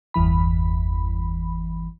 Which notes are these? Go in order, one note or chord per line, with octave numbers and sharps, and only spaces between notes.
G1 E2 E3 B5